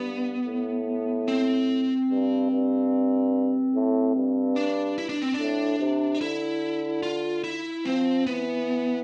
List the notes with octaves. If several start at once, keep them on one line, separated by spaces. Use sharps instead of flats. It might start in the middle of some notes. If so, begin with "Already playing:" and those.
Already playing: G2 B3
A2
C4
G2
G2
A2
G2
D4
E4
D4
C4
D4
A2
C3
D3 E4
F4
E4
F3 C4
E3 B3